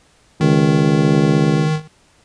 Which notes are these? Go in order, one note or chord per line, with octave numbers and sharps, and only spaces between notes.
C#2 D#3